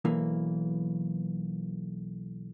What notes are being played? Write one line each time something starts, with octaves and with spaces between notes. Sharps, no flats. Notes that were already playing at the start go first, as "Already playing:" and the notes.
B1 E3 A#3